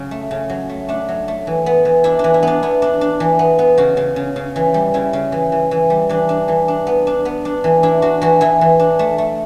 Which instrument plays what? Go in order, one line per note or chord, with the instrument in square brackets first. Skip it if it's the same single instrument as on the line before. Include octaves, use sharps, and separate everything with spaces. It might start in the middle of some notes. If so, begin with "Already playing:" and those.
Already playing: [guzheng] C#3 F#3
A3
C#3
F#3
A3
A3 D4
F#3
A3
E3
B3
E3
D4 E4
D4
E3
E4
B3 D4
B3 E4
D4
D4
E3
B3
B3
C#3 F#4
C#3
C#3
C#3
E3
G3
C#3 E4
C#3
E3
E3
E3
G3
E3 D4
D4
E3
D4
B3
D4
B3
D4
E3
D4 E4
D4 F#4
E3 F#4
E3 E4
E3
D4
A3
A3